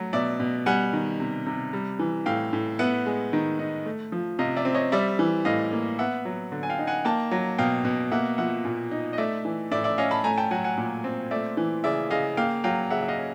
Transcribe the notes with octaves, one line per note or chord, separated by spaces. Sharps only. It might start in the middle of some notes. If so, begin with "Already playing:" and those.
Already playing: F#3 A3
B2 D5 E5
B2
G3 F#5 G#5
D#3
C3
C3
G3
E3
A2 F5 G5
A2
B3 E5 F#5
G#3
D#3
D#4
A3
F3
C3 D#5 F5
D5 E5
C4
C#5 D#5
G3 D5 E5
E3
A2 D#5 F5
A#3
B3 E5 F#5
F#3
D3
G#5
F5 G5
D#4
F#5 G#5
A#3 G5 A5
F#3
B2 F5 G5
B2
A#3 E5 F#5
F3 E5 F#5
A#2
D#4
D#5
A3 D5 E5
E3
A2 D5 E5
D5 E5
C#4 D#5 F5
A5 B5
A3 G#5 A#5
G5 A5
F#3 F#5 G#5
F#5 G#5
A#2
C4
A3 D5 E5
E3
C#3 D5 E5
C#3 D#5 F5
A#3 F5 G5
F#3 F5 G5
C#3 E5 F#5
E5
D#5 F5
C#4